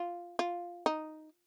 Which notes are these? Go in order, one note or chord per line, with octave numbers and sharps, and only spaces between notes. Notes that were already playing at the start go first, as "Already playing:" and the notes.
Already playing: F4
F4
D#4